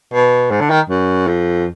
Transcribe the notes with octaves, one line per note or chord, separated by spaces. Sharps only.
B2
G#2
D3
D#3
F#2
F2